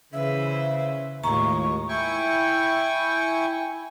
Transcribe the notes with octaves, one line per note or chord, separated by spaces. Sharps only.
C#3 E3 B4 C5 E5
D#2 A2 G#3 F4 A#5 C#6
E4 G5 G#5 C#6